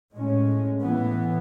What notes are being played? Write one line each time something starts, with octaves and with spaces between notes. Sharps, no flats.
A2 G#3 C#4
A2 E3 B3